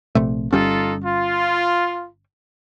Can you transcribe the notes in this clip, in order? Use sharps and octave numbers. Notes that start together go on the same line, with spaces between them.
A#1 C3 A3
G1 G3 C#4 D#4 F4 A4
F4